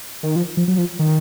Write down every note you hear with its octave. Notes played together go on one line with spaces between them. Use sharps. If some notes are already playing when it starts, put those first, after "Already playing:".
D#3
F3
F3
F#3
F3
D#3